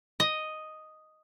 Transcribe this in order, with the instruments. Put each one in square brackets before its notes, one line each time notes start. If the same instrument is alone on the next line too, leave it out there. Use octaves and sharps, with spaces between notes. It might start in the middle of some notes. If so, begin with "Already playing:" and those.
[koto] D#5